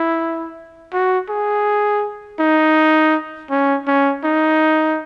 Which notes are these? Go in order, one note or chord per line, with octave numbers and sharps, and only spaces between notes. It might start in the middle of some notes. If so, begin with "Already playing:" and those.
Already playing: E4
F#4
G#4
D#4
C#4
C#4
D#4